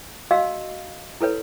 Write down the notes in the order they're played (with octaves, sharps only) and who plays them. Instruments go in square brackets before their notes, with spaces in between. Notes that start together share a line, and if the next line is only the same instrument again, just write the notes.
[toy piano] F#4 D#5 F5 E6
E4 A4 B4 C#5